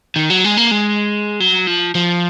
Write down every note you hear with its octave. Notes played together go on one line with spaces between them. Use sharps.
D#3
F#3
G#3
A#3
G#3
F#3
F3
F3